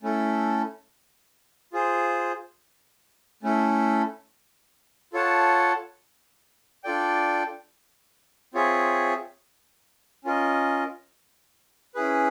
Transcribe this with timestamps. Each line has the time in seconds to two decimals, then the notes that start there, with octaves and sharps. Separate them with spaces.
0.02 A3 C#4 E4 A4
1.73 F4 G#4 C5
3.43 A3 C#4 E4 A4
5.13 F4 A4 C#5 F#5 A5
6.84 D4 F4 A4 D5 G5
8.54 C4 F4 G#4 C#5 E5
10.24 C#4 F4 A#4 D#5
11.95 C#4 E4 G#4 B4